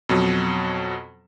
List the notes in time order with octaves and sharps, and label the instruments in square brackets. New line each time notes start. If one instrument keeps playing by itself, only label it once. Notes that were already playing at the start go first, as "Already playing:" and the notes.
[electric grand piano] F2 B2 F#3